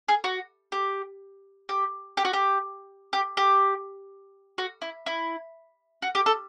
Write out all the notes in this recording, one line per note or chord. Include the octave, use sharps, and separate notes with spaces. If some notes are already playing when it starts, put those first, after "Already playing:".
G#4
F#4
G4
G4
G4
F#4
G4
G4
G4
F#4
E4
E4
F#4
G4
A4